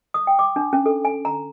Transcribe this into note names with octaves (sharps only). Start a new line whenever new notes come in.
D#6
G5
D6
D4
C#4
A4
G#5
A#5